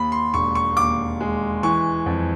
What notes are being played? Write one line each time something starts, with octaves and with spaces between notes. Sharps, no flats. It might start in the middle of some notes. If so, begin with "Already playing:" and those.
Already playing: D#2 B5
C6
E1 C#6
C#6
D#2 D6
G#3
E3 C#6
F2